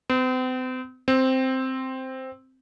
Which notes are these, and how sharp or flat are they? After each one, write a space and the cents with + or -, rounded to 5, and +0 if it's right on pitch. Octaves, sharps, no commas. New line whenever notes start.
C4 -40
C4 +0